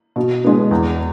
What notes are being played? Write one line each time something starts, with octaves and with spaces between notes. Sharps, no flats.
B2
G#3 B3
E2